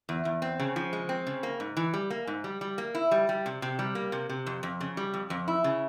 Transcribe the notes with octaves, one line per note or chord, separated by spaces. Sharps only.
E2
E2
C4
C#3
F3
G#3
C4
C#3
A#3
G#2
E3
G3
A#3
G#2
G3
G3
A#3
E4
G3
G3
C3
C3
G3
A#3
C3
C3
F2
F2
C#3
G3
F2
F2
E4
C#3